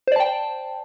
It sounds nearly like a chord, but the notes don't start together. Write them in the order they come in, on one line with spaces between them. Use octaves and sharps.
C5 D5 A5 G5